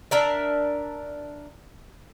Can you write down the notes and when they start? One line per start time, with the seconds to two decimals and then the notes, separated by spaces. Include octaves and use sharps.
0.11 D4 A#4 E5